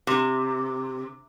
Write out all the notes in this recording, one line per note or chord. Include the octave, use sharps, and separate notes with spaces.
C3